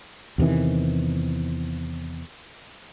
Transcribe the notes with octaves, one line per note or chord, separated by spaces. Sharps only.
E2 C3 D#3 E3